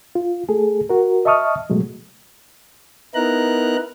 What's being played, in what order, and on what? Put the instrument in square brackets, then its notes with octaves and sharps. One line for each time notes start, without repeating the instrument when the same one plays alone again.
[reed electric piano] F4
A3 G#4 A4
F#4 A#4
D#5 E5 A5 C#6 D#6 F6
B2 F#3 G#3 A3
[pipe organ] B3 D#4 E4 A#4 A#5 F#6